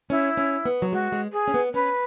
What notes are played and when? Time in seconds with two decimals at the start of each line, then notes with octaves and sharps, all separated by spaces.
0.10 C#4 E4
0.37 C#4
0.65 B3
0.82 F#3
0.92 G#3 F#4
1.12 G#3
1.32 G#4
1.48 C#4
1.54 B3
1.74 C#4 B4